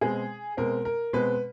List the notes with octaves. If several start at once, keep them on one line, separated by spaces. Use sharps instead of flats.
B2 G#3 C4 G#4
B2 G#3 C4 A#4
A#4
B2 G#3 C4 B4